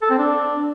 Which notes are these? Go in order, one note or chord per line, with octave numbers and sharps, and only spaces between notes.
A4
C4
D4